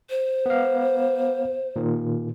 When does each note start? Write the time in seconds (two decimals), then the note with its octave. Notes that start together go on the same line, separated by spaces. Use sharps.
0.10 C5
0.46 B3 F5
1.76 A#2 D#3